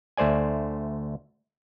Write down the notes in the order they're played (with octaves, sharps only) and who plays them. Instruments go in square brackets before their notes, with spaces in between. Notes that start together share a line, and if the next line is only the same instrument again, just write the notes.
[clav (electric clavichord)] D2 A3 C5 D5 G#5